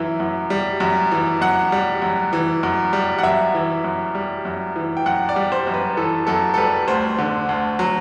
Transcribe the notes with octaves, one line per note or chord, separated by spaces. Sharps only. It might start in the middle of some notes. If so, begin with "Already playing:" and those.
Already playing: F#2 E3 E5
F#2
G3
F#2
E3
F#2 F#5
G3
F#2
E3
F#2
G3
F#5
F#2 E5
E3
F#2
G3
F#2
E3
G5
F#2 F#5
D5
G3
C5
F#2
B4
E3 A4
F#2 A4
A4
G3 B4
D2 C5
D3
D2
F#3